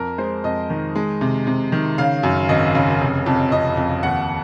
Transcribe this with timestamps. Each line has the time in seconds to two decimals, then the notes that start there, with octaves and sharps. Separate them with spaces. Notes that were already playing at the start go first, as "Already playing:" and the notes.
Already playing: F2 A#4
0.18 G#3 C5
0.44 F2 D#5
0.70 D#3
0.95 G#3
1.21 C3
1.47 C3
1.72 D#3
1.98 C#3 F5
2.23 F#2
2.49 G#1 D#5
2.75 C#3
3.01 F1
3.26 F2
3.52 F2 D#5
3.77 F2
4.03 D#2 F#5